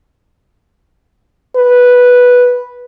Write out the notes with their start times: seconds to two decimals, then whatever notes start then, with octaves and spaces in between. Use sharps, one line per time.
1.56 B4